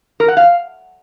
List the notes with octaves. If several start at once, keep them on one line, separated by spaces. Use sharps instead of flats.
A#4
F#5
F5